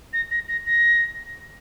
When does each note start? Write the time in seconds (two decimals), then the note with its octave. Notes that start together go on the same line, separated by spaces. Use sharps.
0.13 A#6
0.31 A#6
0.48 A#6
0.66 A#6